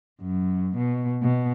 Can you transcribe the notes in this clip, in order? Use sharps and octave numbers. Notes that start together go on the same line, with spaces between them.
F#2
B2
B2